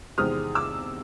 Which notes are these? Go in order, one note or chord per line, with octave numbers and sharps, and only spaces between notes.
E2 C3 D#3 G#3 C4 D#6 F6
D6 E6